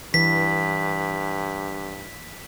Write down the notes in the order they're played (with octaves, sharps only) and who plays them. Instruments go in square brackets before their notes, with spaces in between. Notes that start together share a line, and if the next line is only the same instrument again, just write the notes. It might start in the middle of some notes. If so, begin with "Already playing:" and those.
[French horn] G2 [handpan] E3 B4 [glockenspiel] B6